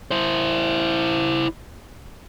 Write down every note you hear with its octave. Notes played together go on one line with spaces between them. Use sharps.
E4 C5